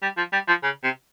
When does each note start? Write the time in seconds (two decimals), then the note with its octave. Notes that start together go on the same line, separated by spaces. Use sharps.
0.02 G3
0.17 F3
0.33 G3
0.48 F3
0.63 C#3
0.83 C3